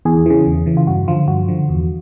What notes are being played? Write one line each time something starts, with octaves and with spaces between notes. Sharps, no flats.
E2 G#4
C#3 E3
E2
C#3 E3
F4
G2 F#4
D3 F3 F4
G2 F#4
D3 F3
E2